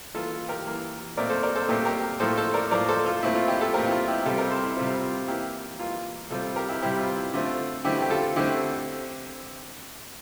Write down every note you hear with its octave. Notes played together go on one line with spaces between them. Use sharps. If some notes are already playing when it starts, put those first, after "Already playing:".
E3 A#3 F4 A4
F4
G4 A#4
E3 A#3
A#2 A3 C4 A#4 D5
A4 C5
A#4 D5
A4 C5
A#2 A3 C4 G4 A#4
G4 A#4
A2 F3 A#3 A4 C5
A4 C5
A#4 D5
A2 F3 A#3 A#4 D5
A4 C5
F4
A#2 A3 C4 E4
F4
E4 G4
F4 A4
A#2 A3 C4 G4 A#4
E4
F4
E4 G4
C3 G3 C4 F4 A4
G4 A#4
A4 C5
E4
C3 G3 C4 F4
F4
E3 A#3 E4 G4
E3 A#3 F4
C3 G3 C4 F4 A4
G4 A#4
E4 G4
C3 G3 C4 E4 G4
F4
E4
D3 A3 C4 F4
D3 A3 C4 E4 G4
G4
F4 A4
D3 A3 C4 E4 G4